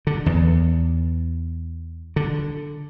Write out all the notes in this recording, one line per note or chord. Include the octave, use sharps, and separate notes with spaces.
D3
E2
D3